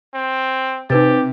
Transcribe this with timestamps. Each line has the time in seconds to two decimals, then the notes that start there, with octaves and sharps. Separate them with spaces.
0.14 C4
0.90 C3 D#4 G4 B4 A6